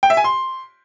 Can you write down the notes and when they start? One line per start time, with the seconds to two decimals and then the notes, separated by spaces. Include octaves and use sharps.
0.03 G5
0.10 E5
0.17 G#5
0.24 C6